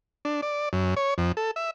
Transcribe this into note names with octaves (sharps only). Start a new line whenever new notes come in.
D4
D5
F#2
C#5
F2
A4
E5